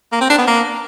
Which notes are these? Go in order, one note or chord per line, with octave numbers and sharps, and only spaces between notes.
A#3
C4
D4
B3
A#3